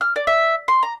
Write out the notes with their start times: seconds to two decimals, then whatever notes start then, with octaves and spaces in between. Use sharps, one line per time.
0.01 F6
0.16 D5
0.27 E5
0.68 C6
0.83 A#5